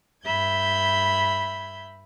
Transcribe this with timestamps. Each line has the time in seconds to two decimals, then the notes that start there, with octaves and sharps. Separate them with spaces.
0.24 G2 E5 B5 G6 G#6